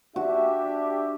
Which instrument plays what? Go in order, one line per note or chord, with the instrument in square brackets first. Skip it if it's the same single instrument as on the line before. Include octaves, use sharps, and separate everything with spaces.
[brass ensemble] D4 G4 E5 [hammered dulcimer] F#4